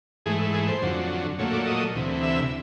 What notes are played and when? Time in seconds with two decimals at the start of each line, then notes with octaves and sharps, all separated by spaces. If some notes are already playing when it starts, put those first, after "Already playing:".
0.26 G#2 E3 A3 G#4
0.54 G#4
0.68 C5
0.82 F2 D3 F#3
1.39 A#2 F#3 A3 C#5
1.53 D5
1.67 D#5
1.95 D2 C3 E3
2.23 E5